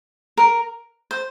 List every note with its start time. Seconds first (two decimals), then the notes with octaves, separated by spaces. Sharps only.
0.37 A#4
1.11 C5